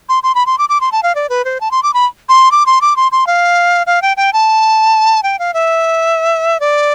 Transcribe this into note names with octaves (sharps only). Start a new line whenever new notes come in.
C6
C6
B5
C6
D6
D6
C6
A5
F5
D5
B4
C5
A5
C6
D6
B5
C6
D6
C6
D6
C6
C6
F5
F5
G5
G5
A5
G5
F5
E5
D5